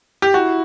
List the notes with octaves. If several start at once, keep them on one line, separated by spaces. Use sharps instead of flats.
G4
E4 F#4